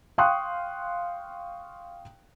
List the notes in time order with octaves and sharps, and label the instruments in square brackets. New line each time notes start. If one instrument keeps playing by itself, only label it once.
[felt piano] F5 G5 C6 C#6 D#6 F#6